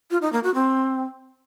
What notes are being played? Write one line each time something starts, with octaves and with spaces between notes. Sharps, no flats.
F4
D#4
A#3
F#4
C4